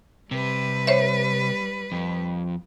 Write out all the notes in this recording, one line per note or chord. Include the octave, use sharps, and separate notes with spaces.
C3 G3 B4
C5 C#5 E5
F2